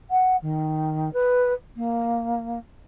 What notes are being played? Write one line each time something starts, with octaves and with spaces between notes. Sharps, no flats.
F#5
D#3
B4
A#3